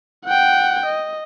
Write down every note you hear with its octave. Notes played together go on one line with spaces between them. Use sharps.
F#5 G5
D#5